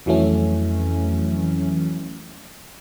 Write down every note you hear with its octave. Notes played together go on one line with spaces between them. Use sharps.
F2 E3 F#3 A3 C#4